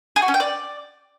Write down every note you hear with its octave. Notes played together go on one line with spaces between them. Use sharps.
G#4
F#4
C#4
G5
D5